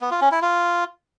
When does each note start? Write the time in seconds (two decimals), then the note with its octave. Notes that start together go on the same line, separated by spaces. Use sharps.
0.01 B3
0.11 F4
0.21 C#4
0.32 E4
0.42 F4